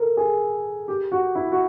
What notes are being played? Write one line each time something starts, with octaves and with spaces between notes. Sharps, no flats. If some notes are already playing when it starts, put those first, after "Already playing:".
Already playing: A4 A#4
G#4
G4
F#4
E4
F#4